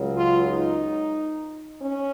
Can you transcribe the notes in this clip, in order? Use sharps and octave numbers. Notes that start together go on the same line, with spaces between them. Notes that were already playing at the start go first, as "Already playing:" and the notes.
Already playing: C#2 C#3 F#3
F4
D#4
C#4